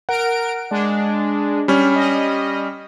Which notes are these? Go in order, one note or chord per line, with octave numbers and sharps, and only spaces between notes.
A#4 F#5 D7
G#3 D4
G3 C#4
D#5